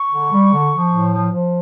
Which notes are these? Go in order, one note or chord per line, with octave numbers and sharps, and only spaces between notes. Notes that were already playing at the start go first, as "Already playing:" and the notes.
Already playing: C#6
D3
G3
D3
F3
A2
F3
F3